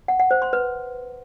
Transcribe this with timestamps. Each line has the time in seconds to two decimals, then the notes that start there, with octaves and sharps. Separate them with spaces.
0.08 F#5
0.19 F#5
0.31 C5
0.42 C6
0.53 B4